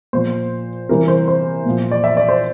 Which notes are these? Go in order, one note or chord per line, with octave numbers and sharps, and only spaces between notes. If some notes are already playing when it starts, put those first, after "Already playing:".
A#2 F3 C5
C3 E3 G3 A#4
C5
C5
A#2 F3
D5
E5
D5
C5